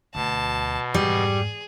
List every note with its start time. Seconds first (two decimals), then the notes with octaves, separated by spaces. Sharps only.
0.15 D2 B2 A5
0.94 F2 G#2 G3 G#4